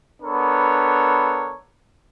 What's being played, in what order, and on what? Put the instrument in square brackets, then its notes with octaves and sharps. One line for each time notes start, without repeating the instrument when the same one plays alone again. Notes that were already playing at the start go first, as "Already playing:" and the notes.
[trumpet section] B3 D4 A4 A#4 C#5 B5